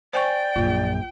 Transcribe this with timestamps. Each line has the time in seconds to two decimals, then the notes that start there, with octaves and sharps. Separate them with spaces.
0.13 C5 D5 G5 G#5 C#6
0.56 A#1 F#2 F4